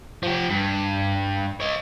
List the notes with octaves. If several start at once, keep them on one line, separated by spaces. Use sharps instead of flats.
F3 G4
G2
C#5 D#5